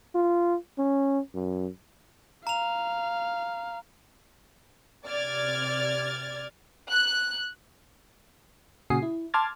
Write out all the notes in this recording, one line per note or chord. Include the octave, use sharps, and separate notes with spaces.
F4
C#4
F#2
F5 A#5 F7
C3 D5 F6 G#6 A6
F#6
A#2 C#3 F#4 G#5 D#6 C7
E4
A5 C6 D6 F6 G#6 A6